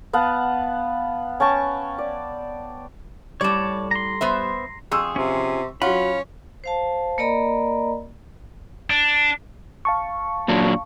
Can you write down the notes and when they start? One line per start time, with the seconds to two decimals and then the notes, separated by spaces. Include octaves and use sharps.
0.13 B3 F5 F#5 A5
1.40 C#4 G5 A5 C#6
1.98 D5
3.41 A2 G3 C#5 D5 A5
3.91 A#5 C6
4.21 B3 C5 E5
4.91 F2 G#4 C6 C#6 E6
5.16 C3 C#4 F4
5.82 F#3 C#4 F4 F#5 B5
6.64 C5 F5 A5
7.18 A#3 A#4 D5 D#5 A#5 B5
8.90 D4
9.85 F5 A5 C#6
10.48 A#2 F#3 D4